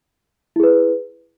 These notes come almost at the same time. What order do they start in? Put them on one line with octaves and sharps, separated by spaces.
E4 G#4 B4